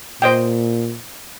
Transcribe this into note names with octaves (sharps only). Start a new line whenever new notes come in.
A#2 C5 D#5 G5